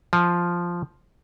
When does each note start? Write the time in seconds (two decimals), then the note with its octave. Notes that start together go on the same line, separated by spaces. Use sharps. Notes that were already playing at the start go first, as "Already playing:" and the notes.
0.13 F3